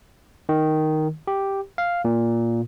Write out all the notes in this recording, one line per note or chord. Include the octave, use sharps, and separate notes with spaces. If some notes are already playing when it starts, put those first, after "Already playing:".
D#3
G4
F5
A#2